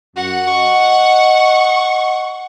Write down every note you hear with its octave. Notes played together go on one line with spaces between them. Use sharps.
F#2 F#4 F#5
D#5 C#6